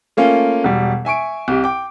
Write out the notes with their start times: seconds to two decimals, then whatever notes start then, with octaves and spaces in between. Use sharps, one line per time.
0.17 A3 A#3 C#4 F4
0.64 E1 G3
1.05 E5 G#5 C#6 D7
1.48 C2 G4
1.64 G5 D6